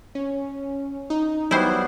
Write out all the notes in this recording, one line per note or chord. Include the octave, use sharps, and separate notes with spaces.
C#4
D#4
F#3 G3 B3 E4 C5